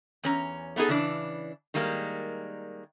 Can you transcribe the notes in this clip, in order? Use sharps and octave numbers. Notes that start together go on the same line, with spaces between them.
E2 C#4 A#5
A3 B3 D#4 G#4 A4
C#3 E3 D4
D#3 G3 G#3 A#3